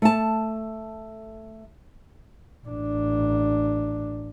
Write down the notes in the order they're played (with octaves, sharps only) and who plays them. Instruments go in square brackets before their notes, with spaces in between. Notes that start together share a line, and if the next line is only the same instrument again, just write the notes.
[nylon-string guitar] A3 A5
[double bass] A1 D4